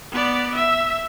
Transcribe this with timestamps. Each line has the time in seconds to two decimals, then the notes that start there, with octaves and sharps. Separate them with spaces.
0.12 B3 D5
0.56 E5